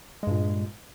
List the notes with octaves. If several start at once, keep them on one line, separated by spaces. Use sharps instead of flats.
G2 A#2 G#3